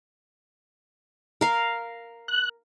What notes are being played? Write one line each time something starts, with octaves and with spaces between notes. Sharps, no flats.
A#4 F5
F#6